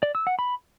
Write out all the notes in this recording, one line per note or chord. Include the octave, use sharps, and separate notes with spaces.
D5
E6
F#5
B5